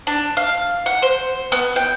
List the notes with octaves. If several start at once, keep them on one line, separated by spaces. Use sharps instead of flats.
D4
F5
F#5
C5
B3
G5